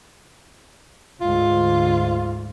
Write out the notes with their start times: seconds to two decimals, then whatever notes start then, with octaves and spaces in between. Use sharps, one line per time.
1.21 D2 G#2 F4